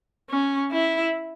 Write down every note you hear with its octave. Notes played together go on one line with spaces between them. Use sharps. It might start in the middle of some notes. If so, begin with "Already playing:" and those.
C#4
E4